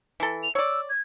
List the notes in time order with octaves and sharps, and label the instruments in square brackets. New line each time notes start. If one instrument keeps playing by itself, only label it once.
[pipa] E3 A4
[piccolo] F7
[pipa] C#5 D5 [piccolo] E6
[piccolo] G#6